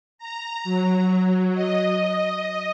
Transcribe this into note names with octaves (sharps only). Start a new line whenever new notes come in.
A#5
F#3
D#5